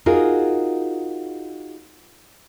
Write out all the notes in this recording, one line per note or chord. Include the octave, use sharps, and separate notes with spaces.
D#4 F4 F#4 G#4 A#4